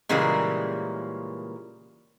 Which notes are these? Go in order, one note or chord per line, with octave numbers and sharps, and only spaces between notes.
A#2 C#3 E3 G3 G#3 A#3